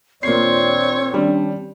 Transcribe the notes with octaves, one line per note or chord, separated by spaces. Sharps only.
A#1 D#2 A#2 C4 C#5 D5 C7
D#3 G3 C#4 D4